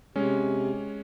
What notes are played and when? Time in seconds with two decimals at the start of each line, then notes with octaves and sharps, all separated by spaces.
0.16 C3 G#3 C#4